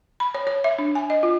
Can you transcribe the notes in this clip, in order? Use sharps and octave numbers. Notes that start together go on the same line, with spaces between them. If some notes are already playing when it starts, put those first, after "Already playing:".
B5
C#5
C#5
E5
D4
G#5
D#5
F4